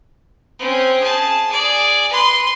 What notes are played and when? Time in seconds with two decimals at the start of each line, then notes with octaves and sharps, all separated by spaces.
0.59 C4 C#4
1.00 G#4 A5
1.49 G#4 D5
2.11 B4 C6